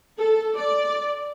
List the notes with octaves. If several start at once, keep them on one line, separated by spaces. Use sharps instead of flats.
A4
D5